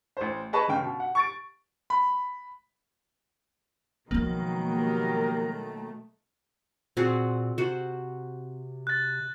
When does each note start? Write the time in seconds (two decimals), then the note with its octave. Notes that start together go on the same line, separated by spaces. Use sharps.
0.17 A1 C5
0.53 G#4 B4 D#5 A5 B5 C#6
0.68 G1 C#3 G5
0.83 B2
1.00 F#5
1.15 C#6 A6 D7
1.90 B5
4.11 B2 D#3 F3 F#3 G#3 A#3
4.73 G4 A#4
5.45 A3
6.97 A#2 C4 F#4 G#4
7.58 C3 F#4 C5
8.87 F#6 A6